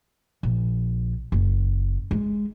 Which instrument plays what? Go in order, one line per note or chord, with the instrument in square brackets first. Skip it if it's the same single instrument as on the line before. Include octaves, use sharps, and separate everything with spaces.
[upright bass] A#1
F#1
G#3